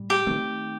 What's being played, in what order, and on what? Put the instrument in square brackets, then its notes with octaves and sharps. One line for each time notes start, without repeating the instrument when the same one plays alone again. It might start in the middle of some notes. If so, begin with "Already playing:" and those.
Already playing: [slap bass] A2 G3
[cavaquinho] G4
[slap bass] D#3 A3 C4